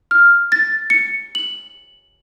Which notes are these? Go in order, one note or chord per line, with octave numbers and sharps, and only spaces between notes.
F6
A6
C#7
F#7